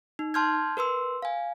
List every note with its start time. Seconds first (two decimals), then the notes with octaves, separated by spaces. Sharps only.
0.19 D#4
0.34 A5 C6 F6 G6 G#6
0.77 A#4 B4 C6 E6
1.22 F5 G#5